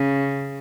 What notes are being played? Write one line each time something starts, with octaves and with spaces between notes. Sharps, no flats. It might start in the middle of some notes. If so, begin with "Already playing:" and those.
Already playing: C#3